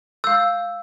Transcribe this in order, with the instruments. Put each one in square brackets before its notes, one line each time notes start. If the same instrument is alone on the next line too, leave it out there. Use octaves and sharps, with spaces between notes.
[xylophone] F5 G6 [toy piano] E6